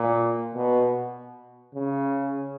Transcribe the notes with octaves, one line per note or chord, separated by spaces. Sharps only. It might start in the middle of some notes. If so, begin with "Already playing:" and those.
Already playing: A#2
B2
C#3